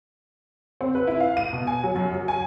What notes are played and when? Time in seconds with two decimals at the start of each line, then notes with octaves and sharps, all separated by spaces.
0.81 C4
0.95 B4
1.07 E4
1.20 F5
1.37 D#7
1.53 B2
1.67 G#5
1.84 F#3
1.96 F#2
2.15 F#3
2.28 G#5